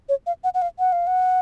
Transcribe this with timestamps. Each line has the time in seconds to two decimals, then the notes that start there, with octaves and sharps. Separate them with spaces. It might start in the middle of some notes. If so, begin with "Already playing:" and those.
0.09 C#5
0.27 F5
0.44 F#5
0.54 F#5
0.62 F5
0.79 F#5
0.92 F5
1.07 F#5